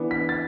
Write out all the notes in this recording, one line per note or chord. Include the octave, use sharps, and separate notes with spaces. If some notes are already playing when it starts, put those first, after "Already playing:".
Already playing: E3 B3 D4
B6
A6